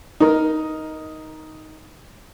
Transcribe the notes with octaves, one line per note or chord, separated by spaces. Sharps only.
D#4 A#4